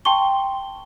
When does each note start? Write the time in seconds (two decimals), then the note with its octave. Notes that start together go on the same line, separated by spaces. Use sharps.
0.05 G5 A5 C6 C#6 G7